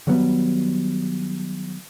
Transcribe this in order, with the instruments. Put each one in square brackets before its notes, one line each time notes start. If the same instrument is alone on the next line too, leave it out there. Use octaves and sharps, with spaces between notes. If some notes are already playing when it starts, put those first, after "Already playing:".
[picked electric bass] D#3 F#3 G3 B3